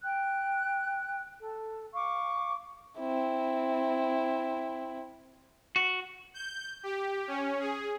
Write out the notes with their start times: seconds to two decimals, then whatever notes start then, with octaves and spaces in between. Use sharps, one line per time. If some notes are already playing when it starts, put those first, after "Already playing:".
0.03 G5 F#6
1.39 A4
1.94 F5 C#6 D6
2.99 C4 E4
5.76 F#4
6.34 G6
6.83 G4
7.28 C#4
7.60 G#4